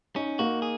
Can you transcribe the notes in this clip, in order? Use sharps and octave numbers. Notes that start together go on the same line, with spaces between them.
C#4 D#4
A#3 F#4
G#4